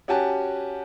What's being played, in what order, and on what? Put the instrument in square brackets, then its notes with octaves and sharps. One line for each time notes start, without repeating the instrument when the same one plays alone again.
[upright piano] C#4 F#4 G4 G#5 A5